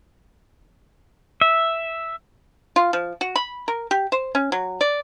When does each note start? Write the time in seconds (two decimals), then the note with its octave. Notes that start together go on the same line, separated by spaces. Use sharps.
1.41 E5
2.76 F4
2.93 F3
3.21 F#4
3.36 B5
3.68 A#4
3.91 G4
4.12 C5
4.35 C#4
4.52 F#3
4.81 D5